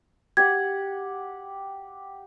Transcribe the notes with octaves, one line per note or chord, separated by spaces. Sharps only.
G4 F#5 G#6